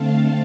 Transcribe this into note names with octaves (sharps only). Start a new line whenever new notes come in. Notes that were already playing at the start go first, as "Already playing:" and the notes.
Already playing: D3 A3 C4 F5 A5